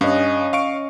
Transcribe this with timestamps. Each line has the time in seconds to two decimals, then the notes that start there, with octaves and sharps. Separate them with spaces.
0.01 G2 C#4 D#5 F5
0.53 F5 C#6 D7